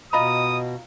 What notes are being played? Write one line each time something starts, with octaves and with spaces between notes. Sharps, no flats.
B2 F4 D#5 A#5 B5 D#6